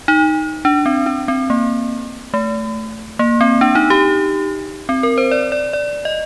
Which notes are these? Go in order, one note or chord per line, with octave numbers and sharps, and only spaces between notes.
D#4
D4
C4
D4
C4
A#3
A3
A#3
C4
D4
D#4
G4
C4
A#4
C5
D5
D5
D5
D#5